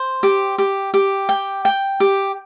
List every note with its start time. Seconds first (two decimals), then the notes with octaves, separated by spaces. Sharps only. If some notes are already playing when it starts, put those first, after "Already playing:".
Already playing: C5
0.23 G4
0.58 G4
0.94 G4
1.29 G5
1.65 G5
2.00 G4